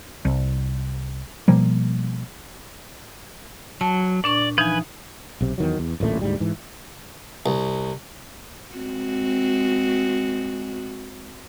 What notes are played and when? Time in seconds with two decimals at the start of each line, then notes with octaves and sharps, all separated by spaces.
0.25 C2
1.48 B2 F3 G3 A#3
3.81 F#3 A5
4.24 A#2 D4 D5 C#6
4.58 E3 F3 D#4 B4 G#5
5.41 B1 C3
5.58 E2 D#3 F#3
5.79 E2
6.00 D1 A1 A#2 A3
6.21 D2 G#2 G3
6.40 G#2 E3
7.46 C2
8.75 G#3 C4 F#4